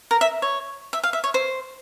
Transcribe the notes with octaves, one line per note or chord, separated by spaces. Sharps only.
A#4
E5
C#5
E5
F5
E5
C#5
C5